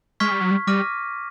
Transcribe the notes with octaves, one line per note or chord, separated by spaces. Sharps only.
G#3 C#6 F6 G#6 B6
G3
F#3
G3
G3 D6 F6 A#6 D#7